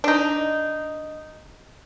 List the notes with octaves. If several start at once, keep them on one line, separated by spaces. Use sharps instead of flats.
D4 D#4